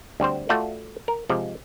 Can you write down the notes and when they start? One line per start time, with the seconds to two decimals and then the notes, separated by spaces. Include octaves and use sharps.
0.20 D2 G3 C4 C5
0.49 A3 F4 F#4 A4 D5
1.08 A#4
1.29 C3 F3 G#3